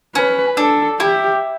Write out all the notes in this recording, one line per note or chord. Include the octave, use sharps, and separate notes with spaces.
C#4 B4
D4 A4
E4 G4